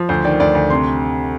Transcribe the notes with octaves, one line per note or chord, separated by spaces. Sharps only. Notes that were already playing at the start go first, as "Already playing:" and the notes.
Already playing: F3
D2 C5
D#3 D5
D2 D5
D2
C3 C6